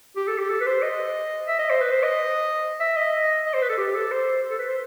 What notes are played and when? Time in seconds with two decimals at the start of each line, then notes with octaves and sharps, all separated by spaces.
0.16 G4
0.28 A4
0.39 G4
0.50 A4
0.60 B4
0.66 C5
0.82 D#5
1.48 E5
1.59 D#5
1.70 C5
1.81 B4
1.92 C5
2.03 D#5
2.80 E5
2.96 D#5
3.46 D#5
3.54 C5
3.62 B4
3.69 A4
3.78 G4
3.95 A4
4.11 C5
4.51 A4
4.59 B4
4.68 C5